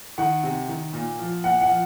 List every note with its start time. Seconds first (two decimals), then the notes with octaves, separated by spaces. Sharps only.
0.18 D#3 F#5
0.44 C3
0.68 D#3
0.93 A#2
1.19 F3
1.44 A#2 F#5
1.61 F#5
1.69 F3